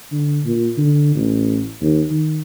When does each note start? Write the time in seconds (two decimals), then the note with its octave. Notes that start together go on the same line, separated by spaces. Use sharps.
0.12 D3
0.46 A#2
0.78 D3
1.15 A1
1.82 D#2
2.11 D#3